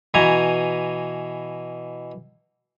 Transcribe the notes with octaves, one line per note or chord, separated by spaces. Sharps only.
B2 E3 G#5 A#5